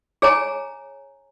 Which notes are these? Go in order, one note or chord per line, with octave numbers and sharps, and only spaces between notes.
G#4 C#5 G#5 A#5